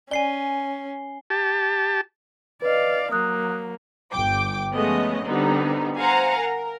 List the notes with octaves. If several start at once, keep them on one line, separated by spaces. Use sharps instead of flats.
C#4 D5 G#5 C7 G7
G4 A5
B4 D5 D#5 F5
F#3 A#3 D#6 F#6
G1 G5 D6
F3 G#3 A3 B3 C#4 D#5
D3 G3 B3 C4 D#4
C5 F5 F#5 G#5 A#5
A#4